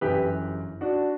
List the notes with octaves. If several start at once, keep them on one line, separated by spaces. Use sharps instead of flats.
G1 F#2 E3 G4 B4
D4 F#4